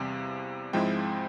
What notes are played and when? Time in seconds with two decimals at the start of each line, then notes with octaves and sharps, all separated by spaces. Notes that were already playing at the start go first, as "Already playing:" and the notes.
Already playing: E2 C3 G3 C4 F5
0.73 G#2 F3 G#3 C4 E4 G5